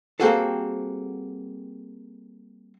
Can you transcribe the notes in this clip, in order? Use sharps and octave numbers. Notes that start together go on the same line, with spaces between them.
G3 A#3 C4 F#4 G#4 A4